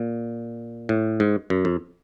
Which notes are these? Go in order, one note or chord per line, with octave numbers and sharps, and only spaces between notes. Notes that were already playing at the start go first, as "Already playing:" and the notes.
Already playing: A#2
A2
G#2
F#2
F2